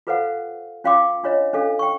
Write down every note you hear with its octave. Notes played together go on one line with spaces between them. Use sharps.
F4 A4 B4 C5 F5 F#5
C#4 F4 F5 G5 C6 D6
D4 F4 C#5 D#5
C#4 D4 A4 F5
G5 C#6